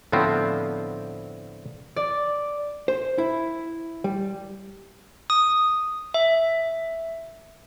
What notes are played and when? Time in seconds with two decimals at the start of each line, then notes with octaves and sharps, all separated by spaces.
0.12 A2 D3 F3 B3 C4
1.96 D5
2.88 C5
3.18 E4
4.04 G3
5.30 D#6
6.14 E5